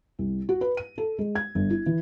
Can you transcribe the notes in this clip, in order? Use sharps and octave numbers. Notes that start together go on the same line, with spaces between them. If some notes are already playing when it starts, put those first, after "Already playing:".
C2
F#4
B4
D#7
A4
G#3
G#6
G1
E4
E3